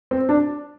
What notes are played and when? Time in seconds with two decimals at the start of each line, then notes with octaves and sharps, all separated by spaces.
0.11 C4
0.29 D4